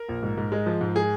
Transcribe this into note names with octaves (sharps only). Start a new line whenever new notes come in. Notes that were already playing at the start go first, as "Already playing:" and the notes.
Already playing: A#4
A#1
G#2
G#2
G#3
F3
G#2
G#4